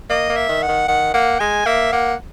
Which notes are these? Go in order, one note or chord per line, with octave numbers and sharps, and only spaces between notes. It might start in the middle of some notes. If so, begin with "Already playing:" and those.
A#3 D#5
A#3
E5
D#3
F#5
D#3
D#3 F#5
A#3 F#5
G#3 G#5
A#3 E5
A#3 F#5